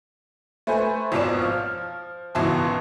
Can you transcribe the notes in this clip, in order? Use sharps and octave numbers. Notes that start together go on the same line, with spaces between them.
A3 B4 C5 G#5
G#1 F2 B2 C#5 D5 E7
F3 F6
G#1 C#2 B2 E3 A5 C6